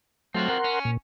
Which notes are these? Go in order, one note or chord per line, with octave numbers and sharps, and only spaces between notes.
F#3 A3 C4 F4 F#4
A#4 F#5 C6
C#4
A#2